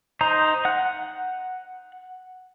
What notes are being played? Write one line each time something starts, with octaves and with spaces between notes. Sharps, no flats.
D#4 C5 A#5
F#5 F#6